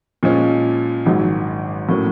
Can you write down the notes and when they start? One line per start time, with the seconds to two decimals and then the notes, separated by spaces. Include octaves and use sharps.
0.23 A#2 F3 G#3 C#4
1.06 G#1 G#2 D#3 F#3
1.89 A2 F#3 A#3 C#4